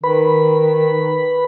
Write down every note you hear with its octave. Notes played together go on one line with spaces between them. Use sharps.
D#3 B4 B5